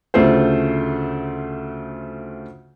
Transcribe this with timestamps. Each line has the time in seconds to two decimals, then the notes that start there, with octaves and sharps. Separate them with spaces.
0.14 D2 C#3 A3 F4 C5